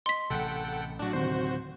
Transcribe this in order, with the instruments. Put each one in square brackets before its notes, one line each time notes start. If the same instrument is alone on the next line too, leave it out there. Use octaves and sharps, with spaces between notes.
[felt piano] D#5 [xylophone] C6 B6
[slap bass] A1 C3 [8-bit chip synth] A4 F#5 G5
[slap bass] A2 F#3 [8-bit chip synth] D4 F#4
[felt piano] D2 C3 D#3 [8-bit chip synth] F#4 C5